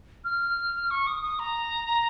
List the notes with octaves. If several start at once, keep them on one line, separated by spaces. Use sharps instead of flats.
F6
C#6
D#6
D#6
A#5